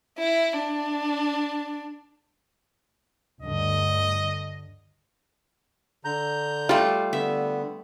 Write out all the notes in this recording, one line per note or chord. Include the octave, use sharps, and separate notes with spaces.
E4
D4
D2 G2 D3 D#5
D3 A#5 G6
G3 A3 F4
D3 B3 E5